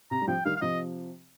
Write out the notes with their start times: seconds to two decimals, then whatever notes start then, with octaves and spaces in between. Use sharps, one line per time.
0.11 C3 A#5
0.21 G3
0.27 C3 F3 G5
0.45 D#3 G3 F5
0.56 F5
0.61 C3 F3 D#5